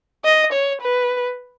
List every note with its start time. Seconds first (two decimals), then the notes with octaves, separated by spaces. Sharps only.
0.25 D#5
0.52 C#5
0.81 B4